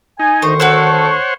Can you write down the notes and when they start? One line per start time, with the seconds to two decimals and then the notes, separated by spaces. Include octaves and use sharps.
0.19 D#4 G#5
0.42 D2 D#3 C5 C#6
0.60 F#4 A4 C5 C#5 F#5 E6